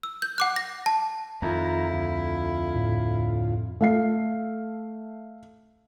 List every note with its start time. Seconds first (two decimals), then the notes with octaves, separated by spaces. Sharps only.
0.03 E6
0.22 G6
0.38 F#5 D6 F#6
0.56 A#6
0.86 A5
1.42 F2 D#3 E4 F4 A#5
1.91 D2 F4
2.76 A2
3.81 A3 F5 C7